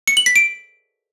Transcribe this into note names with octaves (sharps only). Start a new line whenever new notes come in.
C#7
F#7
B6
D7